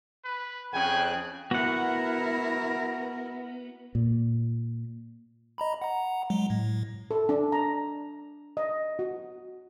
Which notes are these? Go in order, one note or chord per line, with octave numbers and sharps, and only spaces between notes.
B4
F2 C#3 G5 G#5 F#6
B3 E4 F#4 A#4 F#5
A#2
D#5 A#5 B5
F#5 A#5
F#3 G#3
A2
A4
D4
A#5
D#5
F#4